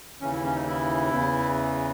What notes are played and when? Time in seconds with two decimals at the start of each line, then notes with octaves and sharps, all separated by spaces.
0.21 D#2 C#3 E3 C#4
0.32 E4
0.44 C#4
0.55 D#4
0.67 E4
1.11 E2 C#3 E3